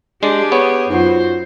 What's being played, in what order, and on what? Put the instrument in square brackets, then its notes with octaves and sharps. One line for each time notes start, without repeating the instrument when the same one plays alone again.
[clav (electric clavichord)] G#3 [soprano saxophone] D4 [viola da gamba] G4 G#4
[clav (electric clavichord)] B3 [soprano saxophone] C#5
[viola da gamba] F#2 C5 [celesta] D#4 F4 [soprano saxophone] F#4